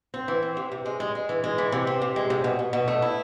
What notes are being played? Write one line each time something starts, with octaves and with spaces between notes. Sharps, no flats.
C4
E3
C4
C3
C3
G#3
G#3
G#3
E3
G#3
E3
C3
C4
C3
G#3
C3
B2
B2
B2
A3
E4